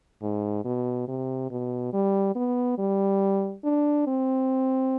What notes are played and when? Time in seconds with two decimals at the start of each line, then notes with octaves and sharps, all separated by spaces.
0.23 G#2
0.65 B2
1.08 C3
1.51 B2
1.93 G3
2.36 B3
2.78 G3
3.64 D4
4.07 C4